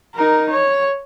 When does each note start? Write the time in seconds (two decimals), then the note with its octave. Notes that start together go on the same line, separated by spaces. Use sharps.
0.15 D#4 A#4
0.50 C#5